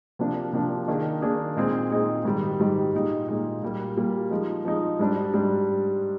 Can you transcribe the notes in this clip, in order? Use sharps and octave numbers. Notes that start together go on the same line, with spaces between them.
C3 F3 A#3 D4
C3 F3 A#3 D4
D#3 A#3 D4 G#4
D#3 A#3 D4 G#4
A#2 G#3 C4 D#4 G#4
A#2 G#3 C4 D#4 G#4
G#2 D#3 G3
G#2 D#3 G3
A#2 G#3 D#4
A#2 G#3 D#4
A#2 G3 A#3
A#2 G3 A#3
F3 G#3 D#4
F3 G#3 D#4
G#2 G3 D4
G#2 G3 D4